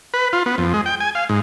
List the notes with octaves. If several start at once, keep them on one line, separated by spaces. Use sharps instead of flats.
B4
F4
B3
F2
G#3
G5
G#5
F5
G#2